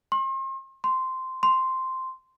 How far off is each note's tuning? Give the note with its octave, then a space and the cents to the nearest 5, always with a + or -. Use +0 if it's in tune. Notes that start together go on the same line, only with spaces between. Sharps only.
C6 +40
C6 -10
C6 -5